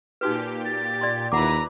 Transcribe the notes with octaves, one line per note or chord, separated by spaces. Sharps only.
A#2 D#4 F#4 G4 B4
A6
D5 C6
D#2 E4 F4 B4 F#5 A#5 D6